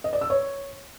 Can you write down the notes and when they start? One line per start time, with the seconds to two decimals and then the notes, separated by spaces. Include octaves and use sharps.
0.04 D#5
0.13 D5
0.21 E6
0.30 C#5